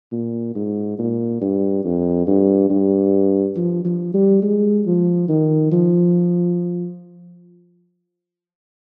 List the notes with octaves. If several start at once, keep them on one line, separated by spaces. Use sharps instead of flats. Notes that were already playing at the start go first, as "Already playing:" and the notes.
A#2
G#2
A#2
G2
F2
G2
G2
F3
F3
G3
G#3
F3
D#3
F3